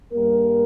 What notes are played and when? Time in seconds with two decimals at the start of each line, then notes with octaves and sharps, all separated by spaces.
0.11 G2 G3 A#3 A#4